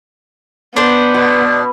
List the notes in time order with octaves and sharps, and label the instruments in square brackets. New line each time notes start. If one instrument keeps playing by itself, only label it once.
[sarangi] B3 [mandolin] D4 C5
[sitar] B2